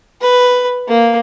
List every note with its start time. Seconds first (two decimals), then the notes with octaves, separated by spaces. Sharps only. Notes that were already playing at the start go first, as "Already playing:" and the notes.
0.22 B4
0.89 A#3